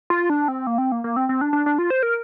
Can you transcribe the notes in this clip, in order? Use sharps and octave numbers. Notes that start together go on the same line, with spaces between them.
F4
D4
C4
A#3
C4
A#3
A#3
C4
C4
D4
D4
D4
F4
C5
A#4